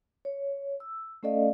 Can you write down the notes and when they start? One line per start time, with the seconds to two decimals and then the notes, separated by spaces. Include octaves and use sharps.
0.25 C#5
0.80 E6
1.23 A3 C#4 A4 D5 D#5 F5